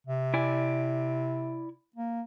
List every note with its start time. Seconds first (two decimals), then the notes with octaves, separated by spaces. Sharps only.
0.07 C3
0.34 E4 D5 G#5
1.96 A#3